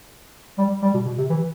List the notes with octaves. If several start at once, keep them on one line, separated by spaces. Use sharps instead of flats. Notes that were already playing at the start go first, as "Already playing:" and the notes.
G3
G3
B2
B2
C3
E3